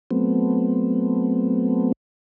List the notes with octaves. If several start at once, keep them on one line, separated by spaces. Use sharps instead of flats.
F#3 A3 B3 C4